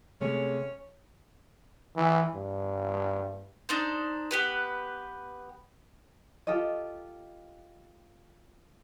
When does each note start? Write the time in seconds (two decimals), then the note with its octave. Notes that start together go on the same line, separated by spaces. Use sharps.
0.21 C3 G#3 A3 C#4
1.96 E3
2.34 G2
3.69 D4 D#4 C5
4.31 B3 G4 B4
6.47 F4 G4 A4 D#5